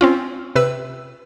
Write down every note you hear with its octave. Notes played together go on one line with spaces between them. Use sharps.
C4 C#4 F4
C3 B4 E6